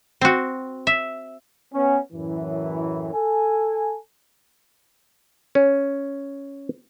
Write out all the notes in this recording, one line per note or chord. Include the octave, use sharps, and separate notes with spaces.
C4 F#4
E5
B3 C#4
F#2 A2 E3
A4 G#5
C#4